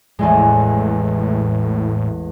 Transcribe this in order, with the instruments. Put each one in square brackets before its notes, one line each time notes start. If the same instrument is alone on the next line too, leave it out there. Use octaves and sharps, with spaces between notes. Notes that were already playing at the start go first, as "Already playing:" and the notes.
[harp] A1 E2 G#3 [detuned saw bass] A2